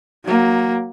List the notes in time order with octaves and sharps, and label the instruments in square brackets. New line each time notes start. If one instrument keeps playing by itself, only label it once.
[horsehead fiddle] F#3 A#3